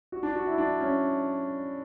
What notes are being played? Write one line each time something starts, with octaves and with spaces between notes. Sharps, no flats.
F#4
D4
F#4
E4
D4
C#4